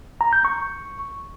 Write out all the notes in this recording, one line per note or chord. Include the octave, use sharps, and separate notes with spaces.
A#5
G6
C#6